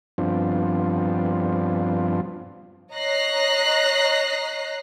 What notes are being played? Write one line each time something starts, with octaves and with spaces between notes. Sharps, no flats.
G2 F3 B3 C4 D4 F4
C#5 D#5 A#5 F#6 A#6 C7